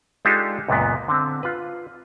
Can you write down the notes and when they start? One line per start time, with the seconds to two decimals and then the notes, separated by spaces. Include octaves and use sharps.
0.25 G#3 D4 D#4 F4 G4 A4
0.68 C#2 F#2 A#2 B3
1.08 D3 C4
1.43 F4 B4